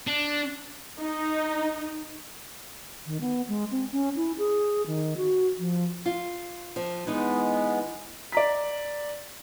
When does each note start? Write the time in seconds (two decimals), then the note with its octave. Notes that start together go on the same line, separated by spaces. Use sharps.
0.07 D4
0.99 D#4
3.07 D#3
3.21 B3
3.48 G#3
3.71 C4
3.92 C#4
4.16 E4
4.38 G#4
4.86 D#3
5.17 F#4
5.59 F3
6.06 F4
6.76 F3
7.07 E3 G#3 B3 D#4
8.32 D5 A#5 B6